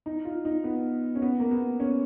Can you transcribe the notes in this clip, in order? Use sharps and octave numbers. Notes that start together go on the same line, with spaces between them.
D#4
F4
D#4
B3
C#4
B3
A#3
B3
C#4